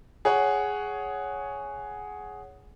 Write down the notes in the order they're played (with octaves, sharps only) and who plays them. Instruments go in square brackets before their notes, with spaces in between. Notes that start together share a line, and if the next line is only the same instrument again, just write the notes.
[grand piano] G#4 C#5 F#5